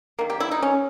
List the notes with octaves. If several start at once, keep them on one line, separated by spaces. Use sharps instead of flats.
D#3 A#3
G4
E4
D#4
C#4